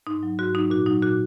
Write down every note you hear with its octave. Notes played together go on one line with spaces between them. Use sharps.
G#2 D#4
F#3
G#2 F#4
F#3 D#4
A#2 F#4
F#3 D#4
A#2 F#4